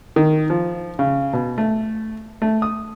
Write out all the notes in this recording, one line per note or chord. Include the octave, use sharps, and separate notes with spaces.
D#3
F3
C#3
B2
A3
A3
D#6